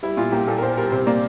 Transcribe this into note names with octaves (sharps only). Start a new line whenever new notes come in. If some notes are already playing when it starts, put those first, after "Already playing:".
G3 E4
A#2 F4
A#3 G4
A#2 A4
A#4
A#2 C5
G3 A#4
C3 C5
A#3 D5